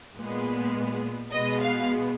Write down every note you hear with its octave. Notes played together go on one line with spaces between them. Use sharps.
A#2 G#3 B3
B2 G#3 B3 D#5
F5